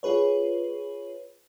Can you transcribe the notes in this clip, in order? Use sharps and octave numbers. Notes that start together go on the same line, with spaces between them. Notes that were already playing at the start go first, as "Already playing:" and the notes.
F4 G#4 B4 C#5